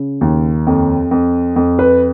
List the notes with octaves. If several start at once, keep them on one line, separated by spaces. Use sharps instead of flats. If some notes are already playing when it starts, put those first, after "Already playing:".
Already playing: C#3
D#2
F2
F2
F2
B4